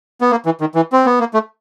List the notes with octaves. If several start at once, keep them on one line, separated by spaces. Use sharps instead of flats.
B3
A#3
E3
D#3
E3
C4
B3
A#3
A3